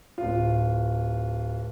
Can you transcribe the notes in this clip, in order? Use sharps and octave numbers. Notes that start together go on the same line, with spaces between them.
D1 F4